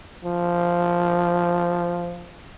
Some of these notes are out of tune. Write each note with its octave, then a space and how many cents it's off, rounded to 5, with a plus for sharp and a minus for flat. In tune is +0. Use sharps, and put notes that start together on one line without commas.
F3 -5